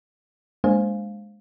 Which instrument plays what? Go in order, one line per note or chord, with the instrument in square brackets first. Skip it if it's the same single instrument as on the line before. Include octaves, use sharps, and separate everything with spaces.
[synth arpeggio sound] G#3 A#3 D4 C5 F5 G#5